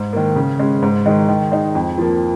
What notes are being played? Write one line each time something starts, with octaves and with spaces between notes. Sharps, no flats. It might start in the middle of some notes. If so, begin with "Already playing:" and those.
Already playing: G#2
D#3 A#3
C#3
G#3 C#4
G#2
D#3 G#3 D#4
D#3
G#3 D#4
F2
F3 A#3